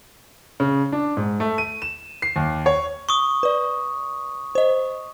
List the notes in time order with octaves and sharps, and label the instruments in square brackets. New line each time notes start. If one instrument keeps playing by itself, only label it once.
[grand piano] C#3
D4
G#2
A3
D#7
E7
C7
D#2
C#5
[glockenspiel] C#6 D#6
[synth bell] B4 D5
C5 D#5